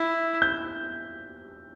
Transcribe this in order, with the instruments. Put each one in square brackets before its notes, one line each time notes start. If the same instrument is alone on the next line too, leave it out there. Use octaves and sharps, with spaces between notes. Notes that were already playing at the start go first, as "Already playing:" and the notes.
Already playing: [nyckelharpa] E4
[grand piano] G6